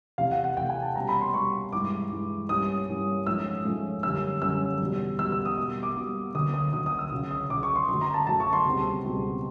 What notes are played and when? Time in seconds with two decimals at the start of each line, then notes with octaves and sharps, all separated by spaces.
0.18 E2 C3 E3 A3 F5
0.31 F#5
0.44 F#5
0.56 E2 C3 E3 A3 G5
0.70 G#5
0.82 A5
0.95 B2 G3 A#3 C#4 A#5
1.08 B5
1.21 C6
1.34 B2 G3 A#3 C#4 C#6
1.72 G2 E3 G#3 D6
2.11 G2 E3 G#3
2.49 G2 E3 G3 A#3 C#4 D#6
2.88 G2 E3 G3 A#3 C#4
3.26 G#2 F3 A3 C#4 E6
3.65 G#2 F3 A3 C#4
4.03 F#2 D3 G3 A#3 C#4 E6
4.42 F#2 D3 G3 A#3 C#4 E6
4.80 E2 B2 G3
5.19 E2 B2 G3 E6
5.32 E6
5.45 D#6
5.58 B2 G3 A#3 D#6
5.83 D6
5.96 B2 G3 A#3
6.34 D2 D3 F#3 A#3 C#4 D#6
6.54 D#6
6.73 D2 D3 F#3 A#3 C#4 D#6
6.86 D#6
6.99 E6
7.11 C#2 C#3 F#3
7.31 D#6
7.50 C#2 C#3 F#3 D6
7.63 C#6
7.76 C6
7.88 F#2 D3 F#3 A3 C6
8.01 A#5
8.14 A5
8.27 F#2 D3 F#3 A3 A5
8.40 C#6
8.53 C6
8.65 C#2 B2 G3 C4
9.04 C#2 B2 G3 C4